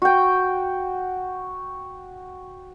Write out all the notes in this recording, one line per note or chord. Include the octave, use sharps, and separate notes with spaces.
F#4 G5